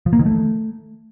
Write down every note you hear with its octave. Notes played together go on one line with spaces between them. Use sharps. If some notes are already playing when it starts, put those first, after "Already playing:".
F3
A#3
D#3
A3